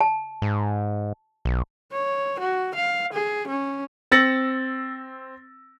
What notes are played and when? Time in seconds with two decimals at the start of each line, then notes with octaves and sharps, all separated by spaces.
0.01 A5
0.42 G#2
1.45 B1
1.92 C#5
2.40 F#4
2.75 F5
3.13 G#4
3.48 C#4
4.11 C4 E6 A6 A#6 C#7 F#7